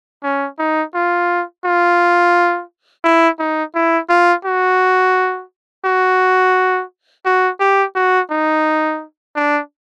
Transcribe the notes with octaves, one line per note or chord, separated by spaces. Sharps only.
C#4
D#4
F4
F4
E4
D#4
E4
F4
F#4
F#4
F#4
G4
F#4
D#4
D4